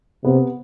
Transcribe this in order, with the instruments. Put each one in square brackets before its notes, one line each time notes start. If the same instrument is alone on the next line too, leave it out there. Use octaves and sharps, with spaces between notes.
[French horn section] C3 [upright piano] B3